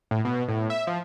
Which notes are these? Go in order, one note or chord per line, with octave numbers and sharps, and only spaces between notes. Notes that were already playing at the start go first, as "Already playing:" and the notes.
A2
B2
A2
E5
F3